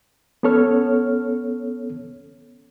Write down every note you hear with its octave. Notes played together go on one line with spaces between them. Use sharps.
B3 C#4 A4 C#5 F6